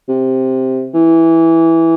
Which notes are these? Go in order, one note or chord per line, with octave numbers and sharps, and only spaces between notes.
C3
E3